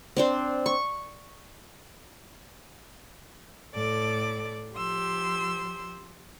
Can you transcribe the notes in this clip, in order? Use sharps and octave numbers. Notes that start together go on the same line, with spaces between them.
C4 D4 C5
C#6
A2 A4 D5 D6
F3 G4 C6 E6